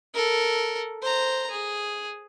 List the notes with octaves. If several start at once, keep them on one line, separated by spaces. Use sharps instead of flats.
A4 A#4
C5 A#5
G#4